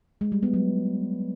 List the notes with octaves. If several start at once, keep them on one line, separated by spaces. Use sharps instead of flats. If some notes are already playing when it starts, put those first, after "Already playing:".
G#3
G3
B3
F#3